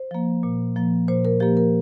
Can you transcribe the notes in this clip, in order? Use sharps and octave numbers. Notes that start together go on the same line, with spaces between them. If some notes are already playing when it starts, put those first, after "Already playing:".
Already playing: C5
F3 A#3
A#2
F3 A#3
A#2 C5
A#4
F3 A#3 G4
A#4